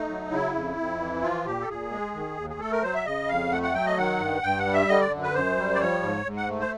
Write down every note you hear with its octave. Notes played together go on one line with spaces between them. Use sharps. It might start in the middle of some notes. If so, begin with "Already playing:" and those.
Already playing: A3 D#4
F#3
C#3 E4
F2
F2
E3
F3 F4
A#2 G4
A4
A#2 G#4
G#3
D#3
D#2
G#4
A3 A4
A#4
F#3 C5
E5
C#3 D#5
F2 F5
A3 F#5
F#5
F#3 G5
D#5
D#3 F#5
G2
G2 G5
F#5
G3
E5
D3 D#5
D5
F#2
B4
F#2 C5
G3
D5
F3 C#5
G#2
G#2
F#5
A3
C5